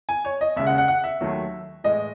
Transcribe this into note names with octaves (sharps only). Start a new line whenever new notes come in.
G#5
C#5
D#5
D#2 C#3 G#3 E5
F#5
F#5
F#5
E5
D#2 D#3 F#3 A3
A2 E3 G#3 D#5